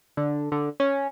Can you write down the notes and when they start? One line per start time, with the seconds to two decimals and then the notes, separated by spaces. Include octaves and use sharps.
0.17 D3
0.52 D3
0.80 C#4